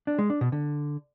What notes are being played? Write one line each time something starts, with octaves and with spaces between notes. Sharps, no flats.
D4
G#3
D4
B2
D3